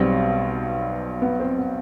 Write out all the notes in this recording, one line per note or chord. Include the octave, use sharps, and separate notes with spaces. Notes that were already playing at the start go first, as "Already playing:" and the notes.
Already playing: B1 B2 G3 C4
B3
C4
B3